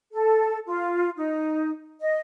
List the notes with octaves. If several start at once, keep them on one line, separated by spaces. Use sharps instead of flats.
A4
F4
D#4
D#5